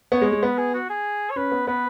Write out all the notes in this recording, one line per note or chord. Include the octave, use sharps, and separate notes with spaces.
B3 C#5
G#3
G#3
B3 B4
G#4
F#4
G#4
C#5
C#4 B4
B3
B3 B4